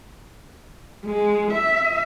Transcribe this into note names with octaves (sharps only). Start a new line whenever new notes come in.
G#3
E5